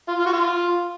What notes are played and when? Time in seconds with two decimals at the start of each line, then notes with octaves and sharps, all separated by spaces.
0.08 F4
0.19 F4
0.26 F#4
0.33 F4